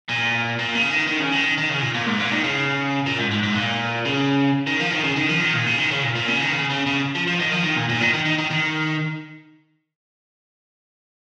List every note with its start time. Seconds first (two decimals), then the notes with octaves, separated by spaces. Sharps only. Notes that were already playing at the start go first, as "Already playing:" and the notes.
0.09 A#2
0.59 A#2
0.75 C#3
0.91 D#3
1.08 D#3
1.20 C#3
1.32 D#3
1.58 D#3
1.69 C#3
1.82 A#2
1.95 A#2
2.07 G#2
2.20 A#2
2.32 D#3
2.44 C#3
3.06 A#2
3.19 G#2
3.31 G#2
3.43 G#2
3.55 A#2
4.05 C#3
4.67 D#3
4.80 F3
4.91 D#3
5.04 C#3
5.16 D#3
5.29 F3
5.41 D#3
5.54 A#2
5.66 C#3
5.78 D#3
5.91 C#3
6.03 A#2
6.15 A#2
6.28 C#3
6.40 D#3
6.52 C#3
6.70 C#3
6.86 C#3
7.15 F3
7.27 F3
7.40 D#3
7.52 F3
7.64 D#3
7.76 A#2
7.89 A#2
8.01 D#3
8.14 D#3
8.26 D#3
8.39 D#3
8.51 D#3